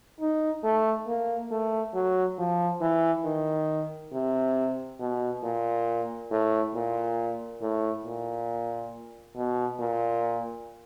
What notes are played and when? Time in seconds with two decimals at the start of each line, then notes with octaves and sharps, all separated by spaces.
0.20 D#4
0.64 A3
1.07 A#3
1.51 A3
1.94 F#3
2.38 F3
2.81 E3
3.25 D#3
4.13 C3
4.99 B2
5.43 A#2
6.31 A2
6.74 A#2
7.61 A2
8.05 A#2
9.36 B2
9.79 A#2